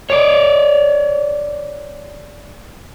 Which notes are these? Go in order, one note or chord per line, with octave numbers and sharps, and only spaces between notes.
C#5 D5